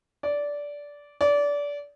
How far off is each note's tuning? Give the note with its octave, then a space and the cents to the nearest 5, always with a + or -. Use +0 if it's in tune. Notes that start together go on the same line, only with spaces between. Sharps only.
D5 -15
D5 -25